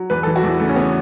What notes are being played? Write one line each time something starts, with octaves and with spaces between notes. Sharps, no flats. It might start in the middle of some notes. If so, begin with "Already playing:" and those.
Already playing: F#3
E2 B4
E3 A4
F#4
E2 E4
C#3 A3
C#4
B3